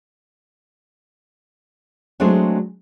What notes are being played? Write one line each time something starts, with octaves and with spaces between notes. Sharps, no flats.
F#3 G#3 A3 C4 D4 G#4